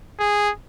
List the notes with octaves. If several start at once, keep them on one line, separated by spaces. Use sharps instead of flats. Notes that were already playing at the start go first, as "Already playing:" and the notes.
G#4